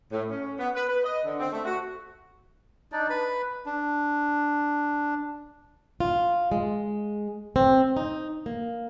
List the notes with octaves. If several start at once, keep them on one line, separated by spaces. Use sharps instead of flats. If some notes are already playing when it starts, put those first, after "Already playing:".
A2
C#4
B3
B4
B4
D#5
D3
C4
A3
F#4
D4 D#4 D5
B4 B5
D4
F4
G#3
C4
D#4
A#3